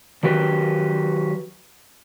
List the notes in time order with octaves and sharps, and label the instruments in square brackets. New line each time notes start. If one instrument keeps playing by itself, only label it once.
[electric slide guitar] D#3 F#3 G4 B4